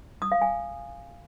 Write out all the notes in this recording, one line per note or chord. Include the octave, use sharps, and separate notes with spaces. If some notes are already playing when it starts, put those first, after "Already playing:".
D#6
F5
G#5